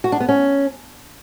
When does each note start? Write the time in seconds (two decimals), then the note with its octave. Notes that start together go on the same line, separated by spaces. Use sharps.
0.04 F#4
0.12 D4
0.20 B3
0.29 C#4